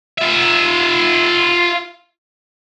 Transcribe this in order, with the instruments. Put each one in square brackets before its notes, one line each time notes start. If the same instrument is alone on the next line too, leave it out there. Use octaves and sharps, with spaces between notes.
[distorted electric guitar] F4 E5